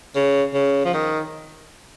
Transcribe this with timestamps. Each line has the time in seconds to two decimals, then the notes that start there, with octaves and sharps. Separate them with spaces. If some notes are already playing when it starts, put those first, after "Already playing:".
0.16 C#3
0.54 C#3
0.85 F3
0.94 D#3